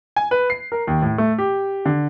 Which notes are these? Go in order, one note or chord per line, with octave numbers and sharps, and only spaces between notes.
G#5
B4
C7
A#4
D#2
A2
A3
G4
D3